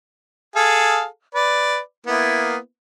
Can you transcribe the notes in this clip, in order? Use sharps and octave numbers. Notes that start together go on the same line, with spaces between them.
G#4 A4 F5
B4 D5
A#3 B3 E4